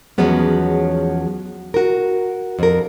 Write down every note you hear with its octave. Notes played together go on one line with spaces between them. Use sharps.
E2 F3 F#3 G#3 B3 C#4
F#4 A#4
F2 A#4